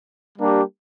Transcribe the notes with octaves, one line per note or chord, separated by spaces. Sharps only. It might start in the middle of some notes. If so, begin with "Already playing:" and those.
G3 A#3 D4 G4